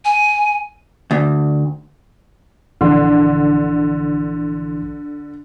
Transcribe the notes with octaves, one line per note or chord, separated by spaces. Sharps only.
G#5
D2
A#1 D3 E3 C6